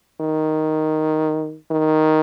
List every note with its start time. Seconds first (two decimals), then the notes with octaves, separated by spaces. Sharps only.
0.20 D#3
1.71 D#3